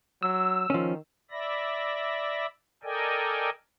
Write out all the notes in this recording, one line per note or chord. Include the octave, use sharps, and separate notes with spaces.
F#3 E6
D#3 F3 C#4
D5 E5 B5 A#6
A4 A#4 D5 D#5 G5 G#5